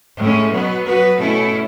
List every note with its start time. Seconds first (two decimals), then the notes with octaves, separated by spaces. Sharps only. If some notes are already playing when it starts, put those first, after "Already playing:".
0.18 A2 G#3 C#4
0.51 B2 F#3 B3 F#4
0.85 F#3 B3 F#4 B4
1.18 B2 A3 C#4 E4 A4